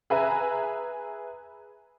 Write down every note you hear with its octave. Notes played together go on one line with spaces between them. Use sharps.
G#4 B4 E5 G#5 A#5